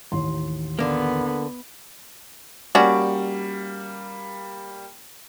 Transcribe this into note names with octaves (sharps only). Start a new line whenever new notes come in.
A1 D#2 C6
D3 A#3 B3
G3 A#3 C#4 F#4 D5